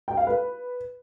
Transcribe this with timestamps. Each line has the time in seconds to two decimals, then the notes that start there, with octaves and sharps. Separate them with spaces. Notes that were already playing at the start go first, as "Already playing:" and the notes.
0.08 G5
0.17 F5
0.27 B4